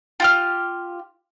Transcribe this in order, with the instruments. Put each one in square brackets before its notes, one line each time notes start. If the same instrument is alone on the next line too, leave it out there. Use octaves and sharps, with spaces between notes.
[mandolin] F4 G4 F6